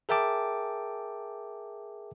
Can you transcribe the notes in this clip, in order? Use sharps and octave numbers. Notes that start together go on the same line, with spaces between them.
G#4 A#4 E5 G5 A5 D6